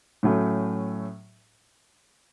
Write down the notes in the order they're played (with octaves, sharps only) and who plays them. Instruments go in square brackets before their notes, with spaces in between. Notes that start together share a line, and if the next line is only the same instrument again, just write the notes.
[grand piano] A2 F#3 A3 C#4